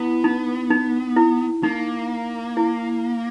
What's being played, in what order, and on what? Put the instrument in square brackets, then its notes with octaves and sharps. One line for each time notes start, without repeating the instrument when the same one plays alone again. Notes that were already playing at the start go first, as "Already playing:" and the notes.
Already playing: [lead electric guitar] B3 [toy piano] E4
[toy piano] D#4
D#4
E4
[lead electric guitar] A#3 [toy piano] D#4
[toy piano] E4